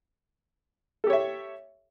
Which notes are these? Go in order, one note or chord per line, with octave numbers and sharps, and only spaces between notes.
G4 A4 C#5 E5